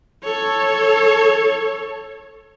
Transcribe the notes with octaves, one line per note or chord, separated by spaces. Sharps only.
A4 C#5